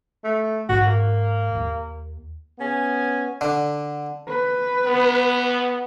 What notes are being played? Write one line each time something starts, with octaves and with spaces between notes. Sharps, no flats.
A3
G#2 F4 F#4
A#3
D#2
B3 C#4 G#5
D3
B4
B3